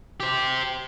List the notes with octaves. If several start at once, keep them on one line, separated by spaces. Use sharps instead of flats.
G4 C5